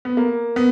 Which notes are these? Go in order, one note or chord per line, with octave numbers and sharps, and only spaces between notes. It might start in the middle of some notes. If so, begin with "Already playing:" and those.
B3
A#3
B3